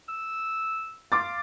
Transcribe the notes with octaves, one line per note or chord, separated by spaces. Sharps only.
E6
F5 C6 D6 A6